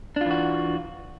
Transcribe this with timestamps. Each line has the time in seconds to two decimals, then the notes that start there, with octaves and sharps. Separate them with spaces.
0.16 D4
0.21 F4
0.26 E3
0.30 F#4